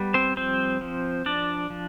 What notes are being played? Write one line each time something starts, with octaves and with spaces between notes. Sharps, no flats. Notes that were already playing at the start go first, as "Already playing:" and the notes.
Already playing: G3 B3
C4 C5
F3 C4 C5
F3
F3 D4 D5
F3